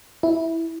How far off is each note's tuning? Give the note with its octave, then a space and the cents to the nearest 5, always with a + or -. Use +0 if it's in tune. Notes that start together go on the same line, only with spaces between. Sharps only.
E4 -10